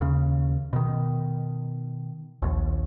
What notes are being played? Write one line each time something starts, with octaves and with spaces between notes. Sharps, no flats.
D#2 C#3
B2 D#3
A#1 D#2